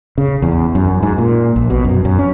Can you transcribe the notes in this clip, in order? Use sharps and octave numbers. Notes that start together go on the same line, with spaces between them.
C#3
E2
F#2
G#2
A#2
A#1
B2
F#2
F#2
C#4